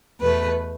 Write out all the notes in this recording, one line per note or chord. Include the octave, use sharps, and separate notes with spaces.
E2 B2 A3 B4